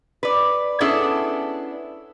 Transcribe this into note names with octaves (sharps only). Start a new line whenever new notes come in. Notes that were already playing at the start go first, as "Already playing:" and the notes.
B4 D5
B3 C#4 D4 E4 G#4 A4